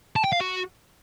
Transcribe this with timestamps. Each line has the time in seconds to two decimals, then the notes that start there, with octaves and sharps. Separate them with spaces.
0.16 A5
0.24 G5
0.32 F5
0.40 F#4